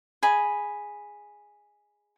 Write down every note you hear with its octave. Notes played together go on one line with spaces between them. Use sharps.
G#4 D#5 B5